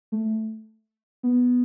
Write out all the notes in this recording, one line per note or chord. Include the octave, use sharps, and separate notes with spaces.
A3
B3